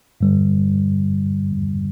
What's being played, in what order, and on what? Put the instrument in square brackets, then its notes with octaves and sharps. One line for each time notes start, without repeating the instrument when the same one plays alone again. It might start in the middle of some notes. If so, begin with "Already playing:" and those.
[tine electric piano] G2 D3 G3